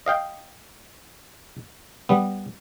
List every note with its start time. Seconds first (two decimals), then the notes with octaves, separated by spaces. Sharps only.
0.06 D#5 F5 G5
2.09 G3 B3